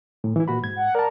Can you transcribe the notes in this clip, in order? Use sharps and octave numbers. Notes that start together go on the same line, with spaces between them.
A2
E3 E4
A#2 F#4 B5
G#2 G#6
F#5
A#4 D5 A5